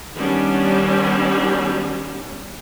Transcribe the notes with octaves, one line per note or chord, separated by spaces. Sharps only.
D#3 G3 B3 C#4 D4